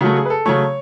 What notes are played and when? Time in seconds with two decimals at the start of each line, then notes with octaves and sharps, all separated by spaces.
0.01 C#3 F#3 A3 F#4
0.16 G#4
0.26 B4
0.30 A4
0.46 C#3 F#3 A3 C#5